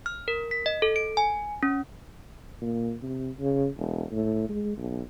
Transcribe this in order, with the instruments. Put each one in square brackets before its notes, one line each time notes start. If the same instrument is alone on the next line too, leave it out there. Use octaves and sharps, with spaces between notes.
[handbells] F6
A#4
B6
D#5
A4
D7
G#5
C#4
[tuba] A#2
C3
C#3
E1
A2
G#3
B1